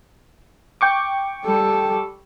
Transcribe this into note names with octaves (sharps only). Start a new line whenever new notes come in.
G5 C#6 D6
G3 A4